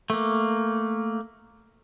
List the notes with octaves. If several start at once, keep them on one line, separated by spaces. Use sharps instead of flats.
A3 A#3